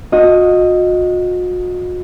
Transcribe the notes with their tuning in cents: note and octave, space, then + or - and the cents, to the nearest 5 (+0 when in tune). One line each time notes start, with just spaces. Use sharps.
F#4 -40 D#5 +0